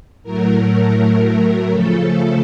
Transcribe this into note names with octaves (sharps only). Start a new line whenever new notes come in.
A2 F#3 A3 A#4
C#3 F3 A3 A4